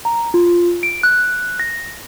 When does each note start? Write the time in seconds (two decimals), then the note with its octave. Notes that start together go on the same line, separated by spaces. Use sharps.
0.05 A#5
0.34 F4
0.83 D7
1.03 F#6
1.60 A#6